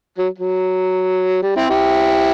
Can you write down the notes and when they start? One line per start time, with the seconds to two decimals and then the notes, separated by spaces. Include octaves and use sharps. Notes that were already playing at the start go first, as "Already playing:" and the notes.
0.18 F#3
0.38 F#3
1.42 G3
1.56 C4 E4
1.69 E4 G4